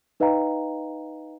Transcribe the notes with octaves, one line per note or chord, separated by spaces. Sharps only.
D#4 B4 D#5 F5 G5 A#5